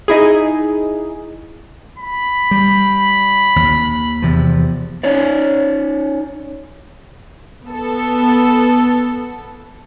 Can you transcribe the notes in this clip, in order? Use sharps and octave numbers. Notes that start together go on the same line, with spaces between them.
D#4 E4 G#4
B5
G3
D#2
E2 C3 F3
C#4 D#4 C#5 D5
B3 A4